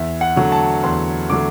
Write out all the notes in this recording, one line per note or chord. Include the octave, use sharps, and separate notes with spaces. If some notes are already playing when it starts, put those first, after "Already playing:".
Already playing: E2 E5
F#5
D3 F#3 A3
A5
E2 C6
D3 F#3 A3 D6